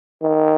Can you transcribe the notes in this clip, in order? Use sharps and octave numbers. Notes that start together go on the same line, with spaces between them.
D#3